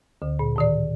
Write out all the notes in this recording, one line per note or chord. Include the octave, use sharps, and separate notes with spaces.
D2 D3
A#2
A2 D#3 D5